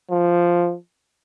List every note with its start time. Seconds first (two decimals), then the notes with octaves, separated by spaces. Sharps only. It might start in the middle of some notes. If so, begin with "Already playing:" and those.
0.10 F3